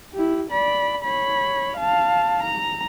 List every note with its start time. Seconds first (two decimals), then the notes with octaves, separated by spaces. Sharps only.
0.14 E4 G4
0.51 D5 B5
1.04 C#5 B5
1.77 F5 A5
2.43 A#5